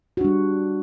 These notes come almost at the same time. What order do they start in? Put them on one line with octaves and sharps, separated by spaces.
F#4 D4 G3